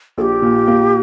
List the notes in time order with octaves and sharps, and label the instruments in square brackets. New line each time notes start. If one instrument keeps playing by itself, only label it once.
[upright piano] A#1 [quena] A4
[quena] G4
[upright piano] A#2
A#3